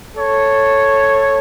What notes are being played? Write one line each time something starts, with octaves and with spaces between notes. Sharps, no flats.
A4 C#5